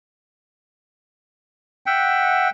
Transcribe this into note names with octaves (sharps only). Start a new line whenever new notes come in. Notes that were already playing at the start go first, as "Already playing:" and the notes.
E5 F#5 G5